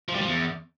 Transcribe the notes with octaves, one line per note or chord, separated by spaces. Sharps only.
F3
G3
F3
E2